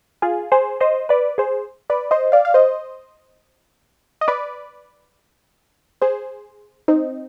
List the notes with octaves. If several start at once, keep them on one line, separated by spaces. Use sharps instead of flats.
F4 G#4
G#4 C5
C5 D#5
B4 D5
G#4 C5
B4 D5
C5 D#5
D5 F5
F5
C5 D#5
D#5
B4 D5
G#4 C5
C4 D#4